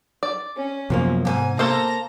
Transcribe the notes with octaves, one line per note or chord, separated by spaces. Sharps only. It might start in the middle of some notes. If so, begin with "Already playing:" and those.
D5
C#4
F#2 C3 F3 A#3 B3
D#2 G#2 G#5
A#3 A4 C5 F5 A#5